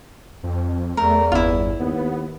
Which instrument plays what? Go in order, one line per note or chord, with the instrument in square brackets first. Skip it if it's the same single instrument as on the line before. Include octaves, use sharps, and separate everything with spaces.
[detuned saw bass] F2
[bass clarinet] E2 [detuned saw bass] A3 [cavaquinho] A#4
[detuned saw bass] G1 [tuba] B3 [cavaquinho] E4 F4
[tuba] D#2 [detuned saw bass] B3